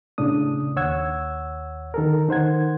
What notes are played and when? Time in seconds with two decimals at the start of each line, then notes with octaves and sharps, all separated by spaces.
0.18 A2 C#3 D4 D#6
0.76 D#2 C#5 F#5 E6 G#6
1.94 D#3 A4 A#4
2.29 D#3 C5 F#5 G#6